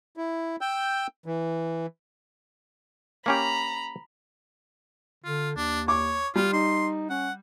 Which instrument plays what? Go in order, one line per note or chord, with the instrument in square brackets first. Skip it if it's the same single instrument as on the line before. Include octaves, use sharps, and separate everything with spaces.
[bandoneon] E4
G5 E6 G6
E3
[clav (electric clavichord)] A#3 C#4 G4 [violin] A#5 B5
[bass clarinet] D3 [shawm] F4
[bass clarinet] D#2 [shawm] D4
[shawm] C#5 [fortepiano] D6
[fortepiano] G3 [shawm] F4
[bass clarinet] D#4 [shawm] C6
[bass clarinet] C#4 [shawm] F#5